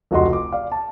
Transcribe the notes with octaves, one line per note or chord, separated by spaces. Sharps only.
F1 C#2 F#4 G4 D#5 C6
D6
D5 F5
A5